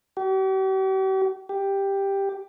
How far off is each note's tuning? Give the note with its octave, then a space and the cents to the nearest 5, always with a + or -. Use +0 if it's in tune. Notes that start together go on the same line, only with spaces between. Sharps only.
G4 -45
G4 +5